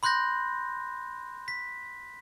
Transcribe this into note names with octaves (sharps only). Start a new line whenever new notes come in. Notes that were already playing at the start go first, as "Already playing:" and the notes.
B5 C6 F#6 G6 A#6
B6